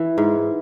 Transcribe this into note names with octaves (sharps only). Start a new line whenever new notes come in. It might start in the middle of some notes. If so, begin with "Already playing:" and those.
Already playing: E3
G#2